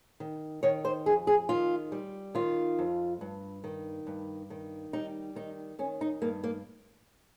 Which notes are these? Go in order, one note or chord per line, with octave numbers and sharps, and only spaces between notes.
D#3
D#3 C#5
C5
F2 G#4
G#4
D#3 F4
G3
D#3 F4
F2
G2
D#3
G2
D#3
G3 D#4
D#3 D#4
D#3 C#4
D#4
G2 A#3
A#3